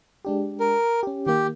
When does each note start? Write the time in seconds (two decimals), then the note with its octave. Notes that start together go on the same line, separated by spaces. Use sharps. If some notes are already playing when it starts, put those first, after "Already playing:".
0.25 G#3 D4 G4
0.60 A#4
1.03 C#4 G4
1.26 D#3 A#3 G4